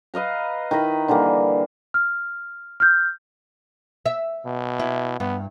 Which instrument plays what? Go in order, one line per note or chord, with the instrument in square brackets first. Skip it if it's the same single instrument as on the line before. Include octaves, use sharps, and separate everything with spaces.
[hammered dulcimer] B4 D#5 F5 A#5
D#3 E4 D#5 B5
D3 E3 G3 A#3
[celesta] F6
F6 G6
[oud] E5
[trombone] B2
[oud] E4
[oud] G2 [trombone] B3